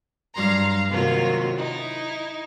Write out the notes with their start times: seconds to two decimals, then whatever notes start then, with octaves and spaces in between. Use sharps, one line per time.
0.34 G2 F#3 G3 F5 A#5 C6
0.89 C3 D#3 F#3 A#3 F4
1.57 D#4 E4